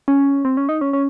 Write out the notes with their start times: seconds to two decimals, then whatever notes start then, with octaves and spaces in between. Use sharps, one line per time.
0.08 C#4
0.45 C4
0.57 C#4
0.69 D#4
0.81 C#4
0.93 C#4